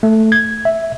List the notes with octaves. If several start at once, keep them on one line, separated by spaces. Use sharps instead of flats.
A3
G#6
E5